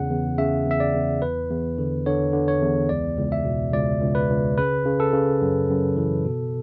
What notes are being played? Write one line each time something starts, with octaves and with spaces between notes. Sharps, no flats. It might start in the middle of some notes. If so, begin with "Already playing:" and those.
Already playing: E2 C#3 F#5
E2
C#3 E5
E2 E5
D5
E2
E2 B4
E2
D3
D3 C#5
D3
C#5
E2
C#2 D5
C#2
E5
B2
C#2 D5
C#2
B4
C#2
C#3 B4
C#3
A4
C#3
F#2
F#2
E3
B2